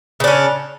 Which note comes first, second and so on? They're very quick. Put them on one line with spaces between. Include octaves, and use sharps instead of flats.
C#3 D4 C#4